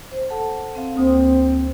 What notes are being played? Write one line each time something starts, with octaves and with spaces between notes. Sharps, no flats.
C5
A4 F#5 A5
C4 F5
D2 A#3 C4 D#6